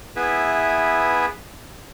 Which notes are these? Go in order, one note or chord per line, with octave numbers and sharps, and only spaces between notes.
B3 E4 G#4 B4 E5